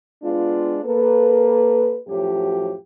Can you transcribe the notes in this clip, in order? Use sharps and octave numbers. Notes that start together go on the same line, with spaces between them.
G#3 B3 D4 F4
A#3 A4 B4
F#2 A2 F3 F#3 G4